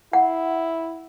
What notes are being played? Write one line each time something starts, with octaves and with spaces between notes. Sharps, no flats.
E4 F#5